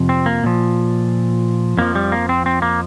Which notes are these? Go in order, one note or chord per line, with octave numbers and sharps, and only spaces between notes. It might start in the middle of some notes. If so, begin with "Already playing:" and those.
Already playing: F2 C3 F3
C4
A#3
A#2 F3
F2 F3 A#3
G3
A#3
C4
C4
A#3